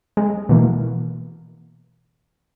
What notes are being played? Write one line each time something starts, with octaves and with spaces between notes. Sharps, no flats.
G#3
B2 E3 A#3